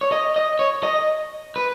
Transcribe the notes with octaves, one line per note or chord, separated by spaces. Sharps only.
C#5
D#5
D#5
C#5
D#5
B4